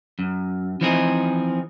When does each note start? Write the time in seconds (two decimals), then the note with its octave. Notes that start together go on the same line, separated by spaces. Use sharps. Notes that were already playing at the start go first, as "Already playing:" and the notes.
0.19 F#2
0.81 E3 F3 C4 D#4 G4 G#4